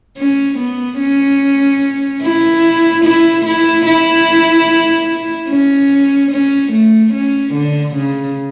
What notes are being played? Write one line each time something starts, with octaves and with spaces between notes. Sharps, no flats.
C#4
B3
C#4
E4
E4
E4
E4
C#4
C#4
A3
C#4
D3
C#3